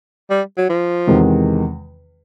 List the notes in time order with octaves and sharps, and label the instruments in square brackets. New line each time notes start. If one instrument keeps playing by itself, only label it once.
[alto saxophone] G3
F#3
F3
[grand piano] E2 C3 D#3 G#3